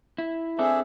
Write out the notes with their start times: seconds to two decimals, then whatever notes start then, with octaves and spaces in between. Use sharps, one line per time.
0.18 E4
0.59 C4 D4 G#4 A4 E5